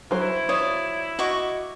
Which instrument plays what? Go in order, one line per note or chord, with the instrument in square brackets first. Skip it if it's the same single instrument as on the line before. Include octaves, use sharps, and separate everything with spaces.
[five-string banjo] F#3 C5 [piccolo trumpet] E4
[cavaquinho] F4 D5 D#6 [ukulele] C#5
[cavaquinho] F#4 C#6 D6 [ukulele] D#5